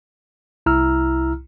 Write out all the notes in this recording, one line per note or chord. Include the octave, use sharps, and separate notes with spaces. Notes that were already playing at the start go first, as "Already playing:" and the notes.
C2 E4 A#5 E6 F6